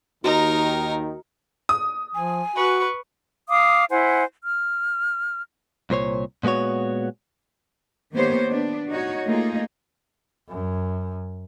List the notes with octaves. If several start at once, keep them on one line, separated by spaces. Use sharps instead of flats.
D#2 D#3 D#4 F#4 A#4
D#6
F3 G#5
F#4 B4 C#6
F5 D6 D#6
E4 C5 F#5 G#5
F6
C2 A#2 C5 C#5
A#2 G#3 B3 F#4 C#5
D#3 A#3 B3 G4 C5 C#5
B3 D4
D#4 F#4 C#5
A3 A#3 D#4 F4 G#4
F#2